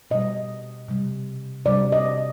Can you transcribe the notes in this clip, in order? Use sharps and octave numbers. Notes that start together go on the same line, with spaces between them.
B2 G3 D#5
C3 G3
C3 G3 D5
D#5